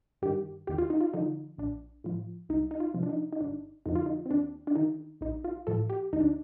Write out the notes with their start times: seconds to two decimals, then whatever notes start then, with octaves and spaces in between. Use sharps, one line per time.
0.22 G2 D#3 G4
0.67 D#2 G4
0.78 F4
0.90 D#4
1.01 F4
1.13 D3 F3 D#4
1.58 A#1 D4
2.04 A2 F3
2.49 C2 D#4
2.71 D#4
2.80 F4
2.94 C3 F3
3.03 D4
3.09 D#4
3.33 D#4
3.40 G1 D4
3.86 F2 D3 F3 D#4
3.95 F4
4.06 D#4
4.26 C4
4.30 D#2 D4
4.67 D4
4.76 D#3 D#4
5.21 A#1 D#4
5.44 F4
5.67 A2 F3 A4
5.90 G4
6.13 D2 D#4
6.21 D4